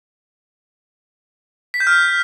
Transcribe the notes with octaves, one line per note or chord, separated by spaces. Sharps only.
B6
G6
F6